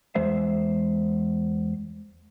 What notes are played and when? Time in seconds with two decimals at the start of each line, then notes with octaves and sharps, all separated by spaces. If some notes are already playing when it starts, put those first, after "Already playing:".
0.15 E2 G#3 C5 E5